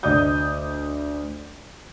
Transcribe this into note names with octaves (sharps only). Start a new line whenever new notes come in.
D2 D5 D#5 D#6 G6